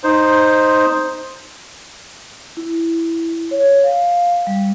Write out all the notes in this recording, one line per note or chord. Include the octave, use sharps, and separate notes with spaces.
D#4 C5
E4
C#5
F5
G3